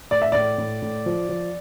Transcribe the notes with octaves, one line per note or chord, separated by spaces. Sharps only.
A2 D5
E5
A2 D5
A2
A2
F3
F3